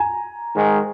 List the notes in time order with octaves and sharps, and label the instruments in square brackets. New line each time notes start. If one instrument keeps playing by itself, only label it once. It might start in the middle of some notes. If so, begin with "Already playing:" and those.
Already playing: [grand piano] G#5 A#5
[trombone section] G#2 D#3 G#3